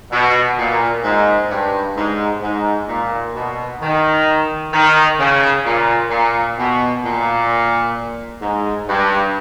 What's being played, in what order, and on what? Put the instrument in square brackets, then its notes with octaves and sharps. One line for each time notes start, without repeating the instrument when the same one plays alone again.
[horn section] B2
A#2
G#2
G2
G#2
G#2
A#2
B2
D#3
D#3
C#3
A#2
A#2
B2
A#2
G#2
G2